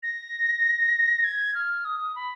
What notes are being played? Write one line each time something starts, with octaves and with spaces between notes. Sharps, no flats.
A#6
G#6
F6
D#6
B5